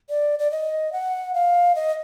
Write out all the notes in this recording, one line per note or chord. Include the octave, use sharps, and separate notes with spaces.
D5
D5
D#5
F#5
F5
D#5